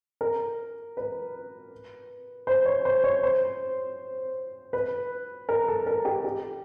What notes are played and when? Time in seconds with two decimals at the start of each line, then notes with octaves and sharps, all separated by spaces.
0.21 A#4
0.97 B4
2.47 C5
2.66 C#5
2.85 C5
3.04 C#5
3.23 C5
4.73 B4
5.49 A#4
5.68 A4
5.87 A#4
6.05 G4
6.24 G4